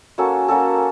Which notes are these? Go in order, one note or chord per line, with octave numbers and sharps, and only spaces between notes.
A#3 C#4 F#4 A4
A#3 C#4 F#4 A4